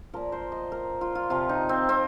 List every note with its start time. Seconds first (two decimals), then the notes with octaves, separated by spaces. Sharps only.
0.14 A#2 F3 A#4
0.32 C5
0.52 D#5
0.72 A#4
1.01 F4
1.15 F4
1.30 C3 F3 F4
1.49 D#4
1.69 C4
1.89 C4